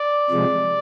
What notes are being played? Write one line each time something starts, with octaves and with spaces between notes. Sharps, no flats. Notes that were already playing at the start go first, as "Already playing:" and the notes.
Already playing: D5
C3 F3 G#3